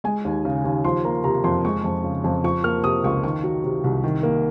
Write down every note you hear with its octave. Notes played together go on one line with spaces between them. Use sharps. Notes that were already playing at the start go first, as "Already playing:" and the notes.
G#3 G#5
D#2
C#3
D#2
F3 C6
A#3 A#5
C3 A#5
F2 C6
G#3 C#6
F2
C#3
F2
F3 C#6
A#3 F6
C3 D#6
C#2 C#6
D#3 C#6
F#3
C3
C2
D#3
A#3